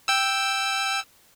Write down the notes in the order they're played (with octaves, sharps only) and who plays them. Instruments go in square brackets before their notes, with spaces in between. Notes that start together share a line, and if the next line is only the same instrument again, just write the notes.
[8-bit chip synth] G5 E6